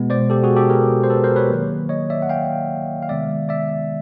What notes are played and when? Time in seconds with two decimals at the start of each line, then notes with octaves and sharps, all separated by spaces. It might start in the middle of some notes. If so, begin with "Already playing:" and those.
Already playing: B2 G#3 B3
0.10 C5 D5
0.30 G4 A4
0.43 F#4 G#4
0.56 G4 A4
0.70 G#4 A#4
1.03 C5
1.10 A4 B4
1.23 A#4 C5
1.36 B4 C#5
1.50 D#3 F#3 A#3
1.89 C#5 D#5
2.10 D5 E5
2.22 F#5
2.29 F5 G5
3.02 F5
3.09 C3 D#3 G#3 B3 D5 E5
3.49 D5 E5